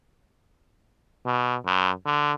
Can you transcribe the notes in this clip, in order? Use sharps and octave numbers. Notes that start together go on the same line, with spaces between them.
B2
F#2
D3